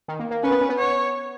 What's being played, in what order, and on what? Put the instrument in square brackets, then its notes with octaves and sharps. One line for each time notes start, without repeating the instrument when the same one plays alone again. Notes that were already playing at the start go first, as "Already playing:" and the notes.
[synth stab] D#3
A#3
A#3
[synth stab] C#4 [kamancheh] B4
[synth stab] B3
C#4
B3
[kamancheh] C#5